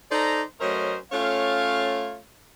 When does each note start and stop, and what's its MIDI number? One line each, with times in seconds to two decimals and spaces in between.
0.12 0.42 63
0.12 0.42 69
0.12 0.42 72
0.12 0.42 74
0.12 0.42 82
0.61 0.97 54
0.61 0.97 57
0.61 0.97 61
0.61 0.97 70
0.61 0.97 72
0.61 0.97 75
1.12 2.19 57
1.12 2.19 61
1.12 2.19 65
1.12 2.19 73
1.12 2.19 77